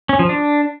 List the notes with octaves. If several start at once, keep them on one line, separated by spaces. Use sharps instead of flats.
C#4
F3
D4